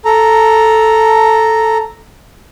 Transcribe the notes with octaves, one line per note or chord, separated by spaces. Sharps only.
A4 A#5